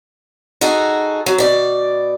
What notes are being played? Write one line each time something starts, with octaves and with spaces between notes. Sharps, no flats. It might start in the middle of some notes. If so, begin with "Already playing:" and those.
D#4 F#4 G#4 A4
F#3
B2 D5